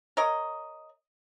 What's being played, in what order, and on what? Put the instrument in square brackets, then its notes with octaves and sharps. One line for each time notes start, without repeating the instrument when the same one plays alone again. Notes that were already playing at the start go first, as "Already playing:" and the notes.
[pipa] A#4 C#5 D#5